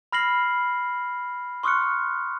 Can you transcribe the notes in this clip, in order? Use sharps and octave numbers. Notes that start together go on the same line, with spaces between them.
B5 F6 A#6 C7 F#7
C6 C#6 D#6 F6 F#6 C#7